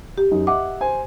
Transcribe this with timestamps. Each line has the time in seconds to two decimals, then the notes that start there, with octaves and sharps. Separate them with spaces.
0.18 G4
0.31 F#2 D#4
0.47 D#5 E5 F#5 D6
0.81 C5 G#5